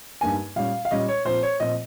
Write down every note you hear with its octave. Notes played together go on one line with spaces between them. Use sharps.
G2 G3 A#3 D#4 G#5
A#2 G3 C#4 F5
F5
A#2 G3 C#4 D#5
C#5
A#2 F3 C4 C5
C#5
A#2 F3 C4 D#5